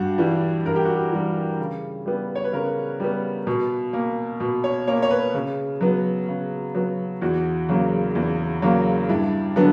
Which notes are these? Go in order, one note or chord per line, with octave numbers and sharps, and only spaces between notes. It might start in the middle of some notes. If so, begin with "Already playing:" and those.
Already playing: G2 F#4
E3 G3
G2 A#4
G4
F#4
G4
E3 G3
C#3
G3 B3
C#5
B4
C#3 A#4
G3 B3
B2
A#3
B2
C#5
A#3 C#5
C#5
B4
C#3
F#3 B3
C#3
F#3 B3
E2 F#4
C#3 F#3 A#3
E2
C#3 F#3 A#3
G2 E4
D3 F#3 B3